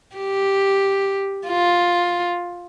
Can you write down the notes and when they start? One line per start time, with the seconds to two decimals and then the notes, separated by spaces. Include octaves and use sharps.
0.16 G4
1.48 F4